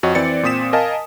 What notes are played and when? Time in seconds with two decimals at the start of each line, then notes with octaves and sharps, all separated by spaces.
0.03 F2 F#4 C#5 D#5
0.15 E3 C4 D5 A6 C#7
0.43 A#2 C4 D#6 B6 E7
0.73 A#4 D#5 F5 G#5 A5